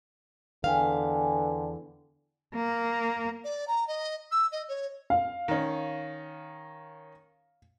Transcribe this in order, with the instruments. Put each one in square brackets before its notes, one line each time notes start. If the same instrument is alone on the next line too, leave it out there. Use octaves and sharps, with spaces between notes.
[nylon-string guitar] E2 F5 [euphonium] D3 [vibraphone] B4 G5 G#5
[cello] A#3
[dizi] D5
A#5
D#5
E6
D#5
C#5
[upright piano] F5
[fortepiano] D#3 C#4